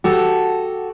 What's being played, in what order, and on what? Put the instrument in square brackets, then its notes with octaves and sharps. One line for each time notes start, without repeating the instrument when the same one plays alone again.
[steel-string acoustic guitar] F#4 G4 A4